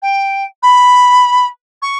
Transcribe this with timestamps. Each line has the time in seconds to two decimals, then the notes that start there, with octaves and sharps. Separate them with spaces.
0.02 G5
0.63 B5
1.82 C#6